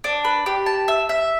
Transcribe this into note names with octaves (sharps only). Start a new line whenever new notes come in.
D4
B4
G4
A5
E5
E5